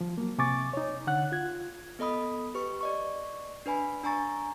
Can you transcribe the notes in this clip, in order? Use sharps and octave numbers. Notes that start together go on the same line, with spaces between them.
F3
F#3 A#3
C3 G#5 C#6 D6 A6
D#4 C#5
D3 F#5 F#6
F4 G#6
B3 A4 D#5 B5 D#6
G4 B4 C#6
D5 D#5 C#6
D4 B4 G#5 B5
D4 G#5 A#5 C#6 A6